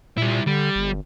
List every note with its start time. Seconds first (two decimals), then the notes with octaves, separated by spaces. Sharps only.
0.18 A#2 G3 E4
0.47 D3 G3
0.76 G1